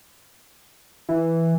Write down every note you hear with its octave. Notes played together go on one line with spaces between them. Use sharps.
E3